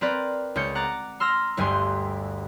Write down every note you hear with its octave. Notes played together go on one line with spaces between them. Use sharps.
C4 A#4 B4 D5
C#2 C#4 G6 C#7
F#5 A#5 D6 A6
C6 E6 F6 A#6
G1 D2 G2 G3 G#5 C6